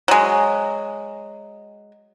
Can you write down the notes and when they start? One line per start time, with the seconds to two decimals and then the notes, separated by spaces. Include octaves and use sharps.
0.08 F#3 G#3